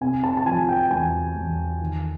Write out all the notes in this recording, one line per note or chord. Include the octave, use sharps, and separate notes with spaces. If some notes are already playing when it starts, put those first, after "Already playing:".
C3 G#5
A5
A5
F3 G#5
G5
E2 G#5
E2
D#3